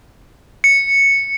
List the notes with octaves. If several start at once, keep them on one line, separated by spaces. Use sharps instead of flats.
C#7